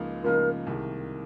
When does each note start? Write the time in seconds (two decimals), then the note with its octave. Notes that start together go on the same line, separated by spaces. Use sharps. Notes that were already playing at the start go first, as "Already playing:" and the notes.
Already playing: C#2 C#3 F3 A#3 D#4
0.24 C#2 C#3 F3 A#3 D#4 A#4
0.67 C2 C3 D#3 G#3